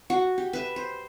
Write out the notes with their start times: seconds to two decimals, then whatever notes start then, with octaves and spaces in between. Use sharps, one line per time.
0.10 F#4
0.38 G4
0.53 B4 E5
0.76 C5